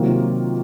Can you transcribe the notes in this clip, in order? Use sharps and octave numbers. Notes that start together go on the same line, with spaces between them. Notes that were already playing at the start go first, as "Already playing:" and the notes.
Already playing: C3 D#3 F#3 A#3 F4